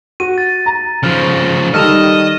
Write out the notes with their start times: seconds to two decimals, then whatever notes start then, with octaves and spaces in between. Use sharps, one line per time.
0.20 F#4 D#7
0.38 A6
0.66 A#5
1.03 C#3 F3 F6
1.74 D#3 G3 A4 D#5 F6 E7 F7